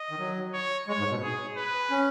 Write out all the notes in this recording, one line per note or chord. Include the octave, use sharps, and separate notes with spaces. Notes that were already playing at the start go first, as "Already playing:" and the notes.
Already playing: D#5
D#3
F#3
C#5
G#3 C#5
G#2
B2
G#4
B4
C#4